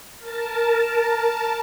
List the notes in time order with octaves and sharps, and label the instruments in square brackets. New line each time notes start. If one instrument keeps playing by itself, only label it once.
[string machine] A#4 A5